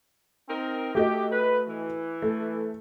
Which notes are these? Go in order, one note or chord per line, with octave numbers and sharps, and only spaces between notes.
C4 D#4 A#4
A3 F#4 G4 D#5
B4
E3
A3